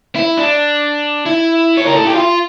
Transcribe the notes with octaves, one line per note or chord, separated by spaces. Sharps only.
E4
D4
E4
C#5
A#4
A4
G4
F4